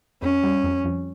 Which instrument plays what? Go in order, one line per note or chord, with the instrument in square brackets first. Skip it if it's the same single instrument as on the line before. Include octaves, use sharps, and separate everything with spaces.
[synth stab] F2 [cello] C#4
[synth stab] G3
F2
F2